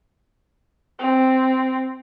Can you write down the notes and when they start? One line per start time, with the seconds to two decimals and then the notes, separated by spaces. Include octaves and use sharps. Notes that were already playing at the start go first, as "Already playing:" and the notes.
0.99 C4